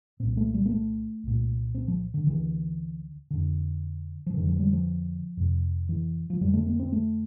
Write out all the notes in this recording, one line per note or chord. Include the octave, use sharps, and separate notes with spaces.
C2 A#2 C4
A3
G3
A#3
A3
C2 A#2
C4
F3
D3
D2 D3 E3
F2 D3
F3
F2 D3 E3
F3
G3
F3
F2 C3
E3
F3
F2 D3 G3
A3
A#3
C4
A3